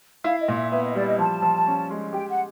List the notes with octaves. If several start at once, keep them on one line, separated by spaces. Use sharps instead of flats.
E4 F5
D#5
A#2
E5
B3 E5
D#5
G3 D5
D#5
F3 A5
F3
C#4
G#3
G4 G5
F#5